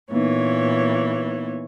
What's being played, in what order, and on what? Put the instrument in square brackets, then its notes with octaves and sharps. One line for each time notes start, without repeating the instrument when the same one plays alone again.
[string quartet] A#2 E3 C#5 [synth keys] A#3 B3 D#4